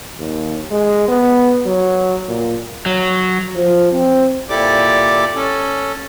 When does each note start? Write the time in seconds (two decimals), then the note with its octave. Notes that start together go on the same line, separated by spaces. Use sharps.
0.19 D#2
0.71 G#3
1.08 B3
1.66 F#3
2.29 A#2
2.86 F#3
3.55 F3
3.92 C4
4.49 A#2 E4 G4 A4 D5 D6
5.36 C#4 A4